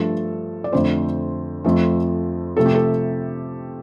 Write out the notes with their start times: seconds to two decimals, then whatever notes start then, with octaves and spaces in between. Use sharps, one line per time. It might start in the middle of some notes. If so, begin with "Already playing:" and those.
Already playing: G2 F3 A3 A4
0.64 D5
0.72 F2 D3 A3 C5
1.64 F2 F3 A3
2.57 C3 F3 A3 A4
2.66 G4
2.75 A4